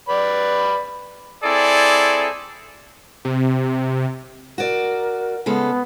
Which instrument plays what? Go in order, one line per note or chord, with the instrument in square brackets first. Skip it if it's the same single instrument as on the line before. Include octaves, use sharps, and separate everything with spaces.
[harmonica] B4 D5 B5
[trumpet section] C4 E4 G#4 A4 D5
[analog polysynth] C3
[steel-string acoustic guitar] F#4 D5 [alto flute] A#4
[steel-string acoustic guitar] C#3 G#3 A4 [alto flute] B3